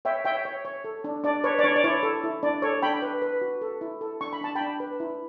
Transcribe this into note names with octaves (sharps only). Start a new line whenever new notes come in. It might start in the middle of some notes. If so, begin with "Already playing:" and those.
C#5 E5 G5
C#5 E5 G5
C#5
C#5
A4
D4
D4 D5
B4 C#5
D5
D4 C#5
D5
E4 C#5
A4
E4
D4 D5
A4 C#5
D4 G5 B5
B4
B4
F#4
A4
E4
A4
D4 C#6
B5
D4 A5
G5 B5
D4
B4
E4